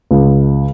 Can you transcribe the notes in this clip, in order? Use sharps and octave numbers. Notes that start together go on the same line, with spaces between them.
C#2